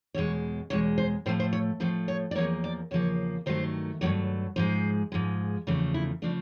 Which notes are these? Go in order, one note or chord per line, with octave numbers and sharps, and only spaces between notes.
E2 B2 G#3 C#5
E2 B2 G#3 C#5
C5
A2 F3 A3 C5
C5
C#5
A2 F3 A3 C5
C#5
D5
E2 C#3 F3 A#3 C#5
D5
E2 C#3 F3 A#3 C#5
G2 D#3 F#3 A3 C5
G2 D#3 F#3 A3 C#5
G#2 F3 G#3 C5
G#2 F3 G#3
E2 C#3 F3 A3
E4
C#3 F3 A3 D4